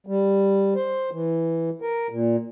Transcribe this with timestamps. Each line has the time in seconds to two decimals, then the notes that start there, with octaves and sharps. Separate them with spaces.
0.07 G3
0.75 C5
1.12 E3
1.82 A#4
2.10 A#2